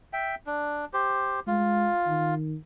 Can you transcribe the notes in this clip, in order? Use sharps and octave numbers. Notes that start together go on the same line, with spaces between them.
E5 G5
D4
G4 C5
G#3 F4
D#3